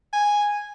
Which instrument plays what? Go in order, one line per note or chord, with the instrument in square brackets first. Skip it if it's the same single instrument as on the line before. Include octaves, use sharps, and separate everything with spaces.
[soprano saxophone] G#5